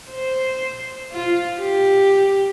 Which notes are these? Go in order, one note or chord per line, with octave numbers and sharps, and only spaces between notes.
C5
F4
G4